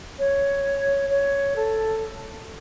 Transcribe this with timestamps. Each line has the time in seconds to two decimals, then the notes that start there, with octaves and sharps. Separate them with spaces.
0.19 C#5
1.10 C#5
1.56 A4